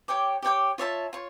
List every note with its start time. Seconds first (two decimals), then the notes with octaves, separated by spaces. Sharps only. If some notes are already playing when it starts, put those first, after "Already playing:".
0.08 G4 C#5 G5 D6
0.42 G4 C#5 G5 D6
0.78 F4 C#5 E5 A5
1.13 F4 C#5